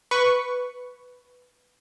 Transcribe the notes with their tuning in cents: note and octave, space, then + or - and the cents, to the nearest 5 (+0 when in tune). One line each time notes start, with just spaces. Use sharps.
B4 +0 C#6 +0